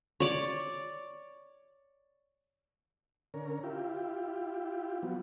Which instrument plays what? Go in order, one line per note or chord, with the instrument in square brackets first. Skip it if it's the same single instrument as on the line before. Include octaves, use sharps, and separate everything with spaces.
[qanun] C#5 D5
[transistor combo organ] D3 C#4 A#4
E4 F4 G4
F3 F#3 B3